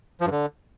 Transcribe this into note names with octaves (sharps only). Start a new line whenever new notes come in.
F3
G2
D3